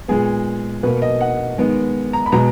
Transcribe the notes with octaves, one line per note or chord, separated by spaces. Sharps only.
A#2 G#3 B3 G#4
B2 A#3 B4
D#5
F#5
D#3 G#3 B3
A#5
B5
B2 G#3 B3 A#5